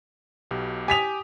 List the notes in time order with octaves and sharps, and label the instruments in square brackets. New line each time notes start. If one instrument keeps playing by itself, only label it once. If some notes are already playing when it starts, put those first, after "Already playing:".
[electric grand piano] B1 B2 G4
[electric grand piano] G4 D#6 [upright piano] G#5 B6 F7